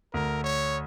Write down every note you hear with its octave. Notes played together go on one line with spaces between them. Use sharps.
D2 A#4
C#5